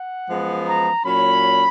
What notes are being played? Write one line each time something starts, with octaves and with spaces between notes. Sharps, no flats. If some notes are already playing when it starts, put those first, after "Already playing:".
Already playing: F#5
F#2 F3 G#3 B3
A#5
A#2 F#3 C#4 B5